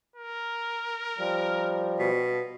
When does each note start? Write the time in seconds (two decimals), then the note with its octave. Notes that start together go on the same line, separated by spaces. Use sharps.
0.16 A#4
1.18 F3 G3
2.00 B2